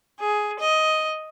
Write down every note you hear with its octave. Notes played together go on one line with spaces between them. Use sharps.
G#4
D#5